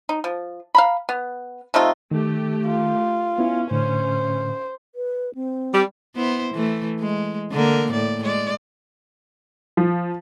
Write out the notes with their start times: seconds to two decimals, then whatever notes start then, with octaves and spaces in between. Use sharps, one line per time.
0.09 D#4
0.24 F3
0.75 F5 A#5 B5
1.09 B3
1.74 C3 A3 D#4 F4
2.11 D#3 A3 G4
2.66 F4
3.38 B3 C#4 E4
3.71 A2 D3 C5
4.95 B4
5.35 C4
5.73 G3
6.16 B3 E4 C5
6.54 E3 A3
7.00 G#3
7.52 D3 A#3 A#4
7.93 A2 D5
8.22 G#3 D5
9.77 F3